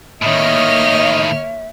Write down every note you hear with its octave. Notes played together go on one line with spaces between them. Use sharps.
A2 D#3 A#3 C#5 D#5 E5 F6